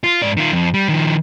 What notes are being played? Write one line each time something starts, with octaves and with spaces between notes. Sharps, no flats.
F4
G#2 D5
D#3 F4
F2
G3
D#3 F3